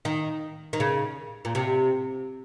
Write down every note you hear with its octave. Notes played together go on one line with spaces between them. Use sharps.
D#3
D#3
C#3
A#2
C3